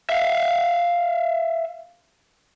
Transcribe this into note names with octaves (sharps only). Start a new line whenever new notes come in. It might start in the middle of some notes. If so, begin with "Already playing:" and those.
E5 F5